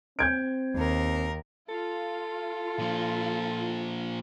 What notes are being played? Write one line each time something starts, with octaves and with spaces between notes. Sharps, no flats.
C4 G6 G#6 D7
D#2 A#4
F4 A4
A#2 F3